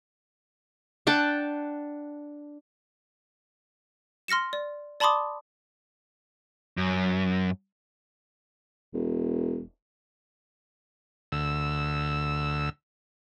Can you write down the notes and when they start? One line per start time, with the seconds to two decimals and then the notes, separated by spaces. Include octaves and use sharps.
1.07 D4 F#5 G5 A5
4.28 C6 F6 A#6 C#7 E7
4.53 D5
5.00 D5 A5 B5 C6 D6 D#6
6.77 F#2
8.93 E1
11.32 D2 E6